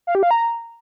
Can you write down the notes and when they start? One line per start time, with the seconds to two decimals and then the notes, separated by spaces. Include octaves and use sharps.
0.07 F5
0.15 G4
0.23 F5
0.31 A#5